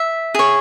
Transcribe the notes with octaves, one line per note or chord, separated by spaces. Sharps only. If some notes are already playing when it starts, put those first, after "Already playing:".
Already playing: E5
G#4 C#5